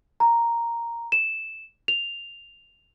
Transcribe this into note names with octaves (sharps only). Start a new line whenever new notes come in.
A#5
E7
F7